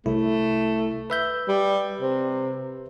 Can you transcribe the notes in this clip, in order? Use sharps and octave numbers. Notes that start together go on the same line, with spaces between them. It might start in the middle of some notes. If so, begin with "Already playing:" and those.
C2 A3 E4
B4 E5 G6
G3
C3